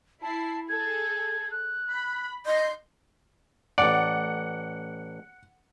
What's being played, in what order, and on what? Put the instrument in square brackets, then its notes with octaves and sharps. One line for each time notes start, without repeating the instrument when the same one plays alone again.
[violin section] E4 C7 [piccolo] A5
[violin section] G#4 A4 [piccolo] G#6
[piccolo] F#6
[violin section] B5
[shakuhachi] D#5 [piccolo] C6 [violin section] G6 C7
[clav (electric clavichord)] A1 D5 [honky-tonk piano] F#5